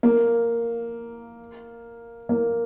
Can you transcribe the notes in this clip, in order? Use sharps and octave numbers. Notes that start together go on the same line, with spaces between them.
A#3
A#3